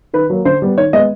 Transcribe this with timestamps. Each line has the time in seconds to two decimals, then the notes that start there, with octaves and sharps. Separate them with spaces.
0.13 D#3 B4
0.30 F#3 A#3
0.45 D3 C5
0.62 G3 B3
0.77 D#3 C#5
0.93 G#3 B3 D#5